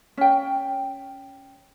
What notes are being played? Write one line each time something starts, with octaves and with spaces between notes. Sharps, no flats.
C#4 G5